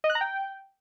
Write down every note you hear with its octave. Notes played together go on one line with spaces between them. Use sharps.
D#5
F#6
A#5
G5